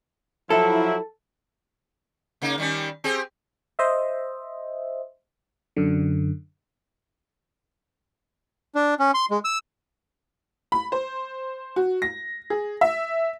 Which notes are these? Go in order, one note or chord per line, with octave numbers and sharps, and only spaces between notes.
F3 F#3 E4 A4
C#3 A#3 D#4
D#3 G3 C#4
C4 G4 G#4
C5 D#5 E5
F#2 D3
D4
C#4
C6
G#3
E6
B5
C5
F#4
A#6
G#4
E5